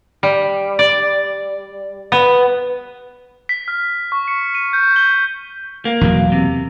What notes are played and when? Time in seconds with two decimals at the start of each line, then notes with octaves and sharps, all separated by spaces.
0.23 G3
0.79 D5
2.12 B3
3.49 B6
3.68 F6
4.12 C#6
4.28 C#7
4.55 D#7
4.73 G6
4.96 G7
5.85 A#3
6.01 E2 B2 F#3
6.32 C3